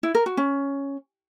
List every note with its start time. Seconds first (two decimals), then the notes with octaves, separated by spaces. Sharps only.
0.03 E4
0.15 A#4
0.26 F#4
0.37 C#4